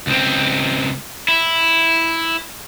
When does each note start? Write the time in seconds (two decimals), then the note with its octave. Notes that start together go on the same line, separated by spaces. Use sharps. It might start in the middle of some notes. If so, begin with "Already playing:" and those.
0.07 C#2 C4
1.28 E4